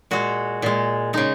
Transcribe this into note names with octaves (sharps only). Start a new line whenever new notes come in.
A#2 G#3 F#4
A#2 G#3
C#3 G#3 D#4